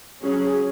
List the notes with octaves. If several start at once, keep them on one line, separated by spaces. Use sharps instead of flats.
F#3 C#4 G#4